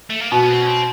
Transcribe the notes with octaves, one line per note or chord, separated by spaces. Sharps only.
A3
A#3
B2 B3
C#4
C4
C#4
C4